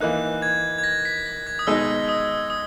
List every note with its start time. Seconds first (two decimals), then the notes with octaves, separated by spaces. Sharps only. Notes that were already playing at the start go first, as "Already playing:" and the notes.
0.01 E3 A#3 D#4 F#6
0.42 G#6
0.78 G#6
0.84 A#6
1.05 B6
1.26 A#6
1.47 G#6
1.59 D#6
1.67 B2 G#3 D#4 E6
2.09 D#6
2.50 D#6